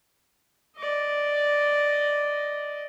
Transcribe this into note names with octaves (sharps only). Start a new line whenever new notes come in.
D5 D#5